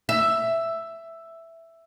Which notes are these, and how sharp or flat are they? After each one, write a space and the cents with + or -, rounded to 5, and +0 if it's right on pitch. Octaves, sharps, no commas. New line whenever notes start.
E5 +5